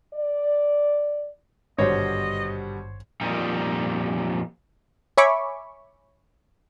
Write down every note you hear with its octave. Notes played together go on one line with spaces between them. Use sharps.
D5
G#1 G2 B2 D3 G3 C5 C#5 D#5
F2 A#2 G3 D#4
C#5 E5 G#5 B5 C#6 D6